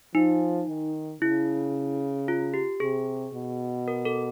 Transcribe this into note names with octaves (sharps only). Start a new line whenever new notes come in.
F3 D#4
D#3
C#3 E4
F4
G4
C3 G#4
B2
A#4
A4